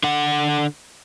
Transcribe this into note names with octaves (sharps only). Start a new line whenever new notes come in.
D3 F#5